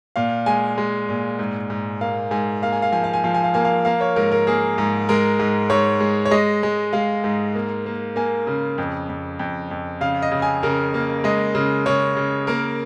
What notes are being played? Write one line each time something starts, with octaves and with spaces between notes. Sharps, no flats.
A#2 F5
G#3 G#5
G#3
A#2
G#2
G#2
A#3 F5
G#2 G#5
A#3 F5
G#5
F5
F3 G#5
F5
G#5
F3 F5
G#5
F5
A#3 G#5
F5
A#3 F5
C#5
G#2 A#4
A#4
A#3 G#4
G#2
G#3 A#4
G#2
G#2 C#5
G#3
C#5
G#3 D#5
G#3
G#3 F5
G#2
A#3
A#3
A#3 G#5
C#3
F2
F2
F2
F2
C#3 F5
D#5
C#3
G#5
C#3 A#4
A#3
G#3 D#5
C#3
C#3 C#5
C#3
A#3 A#4